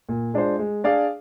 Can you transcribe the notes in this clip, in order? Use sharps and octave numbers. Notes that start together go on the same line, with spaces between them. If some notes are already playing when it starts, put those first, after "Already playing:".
A#2
G#3 D4 F4 C5
G#3
D4 G#4 D5 F5